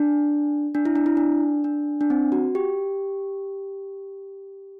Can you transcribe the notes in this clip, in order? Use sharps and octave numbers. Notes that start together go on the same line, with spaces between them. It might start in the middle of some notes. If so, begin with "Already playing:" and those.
Already playing: D4
D4
E4
D4
E4
D4
D4
D4
C4
F#4
G4